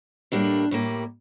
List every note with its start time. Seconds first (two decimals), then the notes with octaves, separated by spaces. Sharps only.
0.32 A2 G3 A#3 D4
0.71 A2 G3 A#3